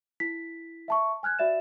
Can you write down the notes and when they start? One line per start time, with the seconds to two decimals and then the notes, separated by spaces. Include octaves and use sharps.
0.20 E4 B6
0.88 E5 A5 C#6
1.23 G#5 F6 F#6 G#6
1.39 F#4 D5 E5 A6 E7